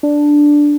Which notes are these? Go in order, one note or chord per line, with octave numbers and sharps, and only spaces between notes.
D4